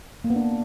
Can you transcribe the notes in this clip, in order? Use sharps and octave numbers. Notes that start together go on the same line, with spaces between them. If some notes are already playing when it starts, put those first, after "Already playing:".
A#3
B3
D4